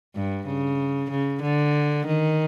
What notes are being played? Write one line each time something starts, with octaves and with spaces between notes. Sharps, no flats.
G2
C#3
C#3
D3
D#3